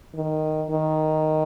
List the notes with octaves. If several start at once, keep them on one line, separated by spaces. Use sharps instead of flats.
D#3
D#3